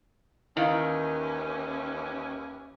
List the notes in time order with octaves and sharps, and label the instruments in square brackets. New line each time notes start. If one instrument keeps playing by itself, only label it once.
[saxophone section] D#2 E3 C#4 [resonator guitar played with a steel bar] D#3 [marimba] E4 F5